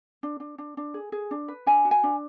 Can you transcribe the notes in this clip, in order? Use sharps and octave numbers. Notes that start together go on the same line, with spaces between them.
D4
D4
D4
D4
G#4
G#4
D4
B4
D4 G#5
F#4
G#5
D4